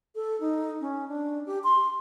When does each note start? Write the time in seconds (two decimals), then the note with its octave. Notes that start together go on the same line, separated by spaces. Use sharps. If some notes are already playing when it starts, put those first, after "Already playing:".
0.15 A4
0.40 D#4
0.81 C#4
1.08 D4
1.46 G4
1.64 C6